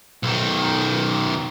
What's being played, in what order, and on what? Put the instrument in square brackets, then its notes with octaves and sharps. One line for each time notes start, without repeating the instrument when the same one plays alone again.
[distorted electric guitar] B1 D#3